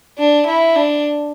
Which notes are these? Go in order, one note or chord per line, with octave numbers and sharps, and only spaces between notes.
D4
E4
D4